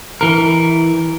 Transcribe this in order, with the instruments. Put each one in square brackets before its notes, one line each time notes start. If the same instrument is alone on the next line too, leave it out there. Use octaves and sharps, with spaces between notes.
[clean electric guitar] E3 A#4